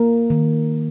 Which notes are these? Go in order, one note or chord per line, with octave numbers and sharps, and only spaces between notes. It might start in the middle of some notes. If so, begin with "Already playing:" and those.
Already playing: A#3 A#4
D#3